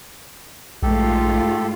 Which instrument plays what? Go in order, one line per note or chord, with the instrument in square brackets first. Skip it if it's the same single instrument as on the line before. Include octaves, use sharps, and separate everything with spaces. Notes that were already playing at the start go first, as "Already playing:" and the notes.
[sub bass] A#1 [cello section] G#2 F4 [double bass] A3 [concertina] G4 A4